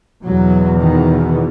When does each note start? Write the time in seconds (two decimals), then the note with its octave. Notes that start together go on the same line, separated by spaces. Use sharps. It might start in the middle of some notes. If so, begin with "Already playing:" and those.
0.24 E2 B2 F#3
0.79 D#3